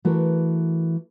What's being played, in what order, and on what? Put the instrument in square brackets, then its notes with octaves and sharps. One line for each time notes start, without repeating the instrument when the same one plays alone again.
[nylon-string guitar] E3 A3 F#4 A#4